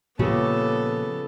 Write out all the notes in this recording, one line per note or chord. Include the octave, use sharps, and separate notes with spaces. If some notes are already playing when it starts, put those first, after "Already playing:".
A#2 C#3 F3 A#3 B3 F4 G4 A4